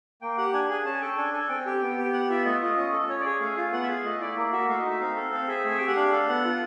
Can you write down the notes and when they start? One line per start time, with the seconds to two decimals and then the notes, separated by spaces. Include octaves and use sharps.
0.22 A#3 G5
0.38 G4 F#5
0.53 D4 G#5
0.69 G#4 G#5
0.85 C#4 A5
0.94 G#5
1.01 A4 G5
1.17 D4 G#5
1.33 A4 G#5
1.49 C4 G5
1.66 G4
1.82 B3
1.98 G4
2.04 G5
2.13 B3 F#5
2.30 F4 E5
2.45 A3 D#5
2.61 F4 D#5
2.77 C#4
2.93 A4
3.08 C#4 C#5
3.20 D5
3.25 G#4 C#5
3.40 A3 F5
3.56 F4 F5
3.72 B3 F#5
3.83 E5
3.88 G#4 F5
4.04 A3 D#5
4.20 E4 D5
4.36 A#3
4.52 F#4 E5
4.68 A3 F5
4.79 D#5
4.84 D#4
4.90 E5
5.00 C4 F5
5.16 A4
5.32 C4 F5
5.48 G#4 E5
5.65 A3 G#5
5.78 G4 G5
5.87 F#5
5.96 D4 F5
6.12 A4 F5
6.28 B3 F#5
6.45 F4